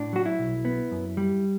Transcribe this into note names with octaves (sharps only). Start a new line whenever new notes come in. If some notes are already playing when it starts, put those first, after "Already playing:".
Already playing: A2 D4
F#3 F#4
E4
B1
B3
F#2
G3